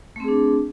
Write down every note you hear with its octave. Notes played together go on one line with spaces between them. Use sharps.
A3 C4 D4 G#4